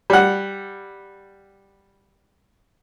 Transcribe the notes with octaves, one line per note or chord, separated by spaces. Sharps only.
G3 F#5